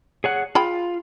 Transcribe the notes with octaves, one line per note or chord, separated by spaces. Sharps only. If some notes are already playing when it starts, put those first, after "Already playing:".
G#4 C#5 F#5
F4 G#4 G5 B5